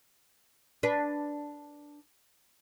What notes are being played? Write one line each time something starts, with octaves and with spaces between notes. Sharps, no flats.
D4 B4